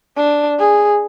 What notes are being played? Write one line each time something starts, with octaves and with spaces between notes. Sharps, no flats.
D4
G#4